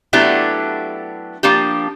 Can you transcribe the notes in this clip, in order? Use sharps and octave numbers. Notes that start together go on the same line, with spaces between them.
F#3 A3 B3 D4 E4 G4
F3 A#3 D4 G4